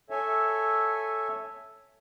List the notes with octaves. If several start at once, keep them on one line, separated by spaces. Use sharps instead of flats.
A4 C#5 E5 G#5